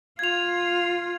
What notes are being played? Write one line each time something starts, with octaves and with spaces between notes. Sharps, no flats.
F4 G#6 F7